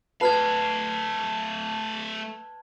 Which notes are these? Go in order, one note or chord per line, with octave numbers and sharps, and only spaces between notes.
A3 B4 F5 A5 F6 G#6